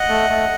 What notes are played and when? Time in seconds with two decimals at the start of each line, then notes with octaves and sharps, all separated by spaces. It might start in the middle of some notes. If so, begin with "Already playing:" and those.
Already playing: D#5 F#5
0.09 A3
0.30 A3